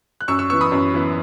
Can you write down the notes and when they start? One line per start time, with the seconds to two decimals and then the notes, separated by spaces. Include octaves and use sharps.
0.21 F#6
0.28 F#2 C#6 E6
0.39 C#6 E6
0.50 E3 B3 C#6 E6
0.61 B5 D#6
0.72 F#2
0.94 E3 B3